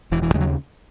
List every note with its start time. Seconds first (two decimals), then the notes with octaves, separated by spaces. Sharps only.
0.12 E1 E3
0.22 E3
0.34 D#2 C#3 G#3
0.40 F#3